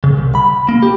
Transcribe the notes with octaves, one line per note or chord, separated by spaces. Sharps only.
C#3
C2
B5
A#3
G4